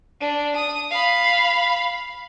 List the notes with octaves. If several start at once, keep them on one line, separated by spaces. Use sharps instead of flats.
D4
D#6
F5 B5